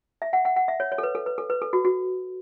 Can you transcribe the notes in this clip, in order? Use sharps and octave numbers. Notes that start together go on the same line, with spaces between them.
E5
F#5
F#5
F#5
E5
C#5
C#5
A4
B4
A4
B4
A4
B4
A4
F#4
F#4